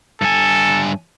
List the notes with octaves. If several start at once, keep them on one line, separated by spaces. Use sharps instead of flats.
G2 A4 G#5